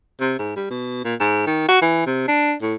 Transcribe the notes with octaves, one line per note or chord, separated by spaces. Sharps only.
C3
G#2
G3
B2
A#2
G#2
D#3
F#4
E3
C3
D4
A2